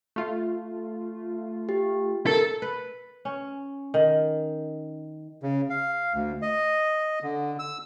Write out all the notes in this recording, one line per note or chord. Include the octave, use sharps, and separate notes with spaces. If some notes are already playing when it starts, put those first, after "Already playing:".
A3 F4
G4
A4 A#4
B4
C#4
D#3
C#3
F5
D2
D#5
D3
E6